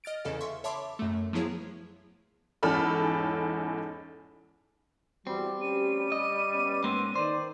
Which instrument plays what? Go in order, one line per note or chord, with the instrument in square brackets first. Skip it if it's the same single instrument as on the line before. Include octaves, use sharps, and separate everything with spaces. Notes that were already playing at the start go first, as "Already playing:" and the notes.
[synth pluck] D#5 F6 A6 D7
E2 C#3 A4 F5
E5 C6 C#6
C#5 E5 A5 B5 C6 D6
F#2 A3
F3 F#3 B3 E4 G#4 C#5
[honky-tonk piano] E2 G#2 C#4 A4 B5 F6
[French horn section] E2 F#4 [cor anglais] G3 [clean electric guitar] C4
[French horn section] D2 C#4 G4 [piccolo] D#7
[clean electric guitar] D#5
[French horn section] B3 C#4
[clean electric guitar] G#2 A#3 [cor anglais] C4
[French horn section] D#3 [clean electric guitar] C5 [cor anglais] D5